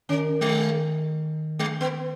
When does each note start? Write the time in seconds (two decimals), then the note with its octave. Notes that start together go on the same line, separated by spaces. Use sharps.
0.09 D#3 C#4
0.41 G#3
1.59 G#3
1.81 B3